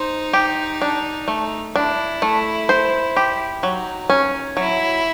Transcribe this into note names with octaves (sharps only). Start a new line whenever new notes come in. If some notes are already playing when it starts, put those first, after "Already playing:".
Already playing: D#4 C5
G4
D4
A3
D4 E4
A3
C5
G4
F#3 D#4
C#4
F#3 E4